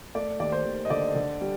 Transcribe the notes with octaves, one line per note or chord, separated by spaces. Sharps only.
A3 D5
D#2 D5
C5
D#2
D#5
D3 D5
D3
G3